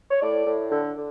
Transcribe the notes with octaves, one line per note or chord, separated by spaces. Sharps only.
C#5
A2 D5
A2
D3
D3